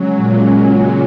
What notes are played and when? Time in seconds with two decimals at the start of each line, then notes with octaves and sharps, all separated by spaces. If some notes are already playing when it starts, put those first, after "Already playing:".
Already playing: C#3 F#3 G#3 C#4
0.16 A#2